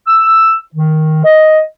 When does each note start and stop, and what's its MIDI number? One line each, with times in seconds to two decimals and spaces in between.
0.07 0.54 88
0.75 1.23 51
1.24 1.60 75